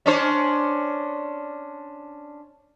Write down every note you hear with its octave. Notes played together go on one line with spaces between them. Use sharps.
C#4 D4 C5